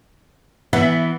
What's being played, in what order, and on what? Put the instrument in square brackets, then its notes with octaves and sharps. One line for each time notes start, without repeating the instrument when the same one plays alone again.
[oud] E3 [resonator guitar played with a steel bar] B3 E5